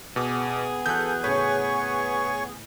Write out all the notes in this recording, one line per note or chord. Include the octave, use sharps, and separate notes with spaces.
B2 B3 G#4 D6
E3 F#4 A4 F#6 G6
A2 C#3 B4 C#5 G#5 C#6